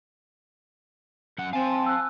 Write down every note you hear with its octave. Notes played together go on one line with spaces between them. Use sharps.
F#2 F#5
C4 F5 G#5 A5
E6 F#6